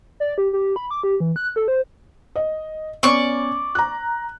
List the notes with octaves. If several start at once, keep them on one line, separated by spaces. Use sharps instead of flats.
D5
G4
G4
B5
D6
G4
E3
F#6
A4
C5
D#5
B3 C#4 D5 C#6
A#5 F#6